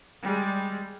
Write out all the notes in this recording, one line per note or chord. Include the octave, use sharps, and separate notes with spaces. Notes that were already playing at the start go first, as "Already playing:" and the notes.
G3 G#3